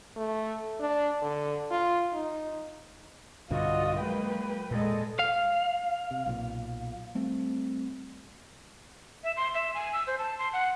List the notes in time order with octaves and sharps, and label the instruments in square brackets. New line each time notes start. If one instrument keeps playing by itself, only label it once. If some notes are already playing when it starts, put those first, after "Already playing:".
[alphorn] A3
D4
D3
F4
D#4
[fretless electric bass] B1 G2 D3 [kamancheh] F4 D#5 [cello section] F#4
[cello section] G#2 F#3 A#3 [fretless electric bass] G#3 [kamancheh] B4 G5
[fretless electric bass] E1 A#2 [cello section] G#3 A4 D#5
[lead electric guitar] F5
[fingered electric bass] C3
B1 A#2
G3 A3 C4
[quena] E5
C6
E5
G#5
E6
C5
A5
C6
F#5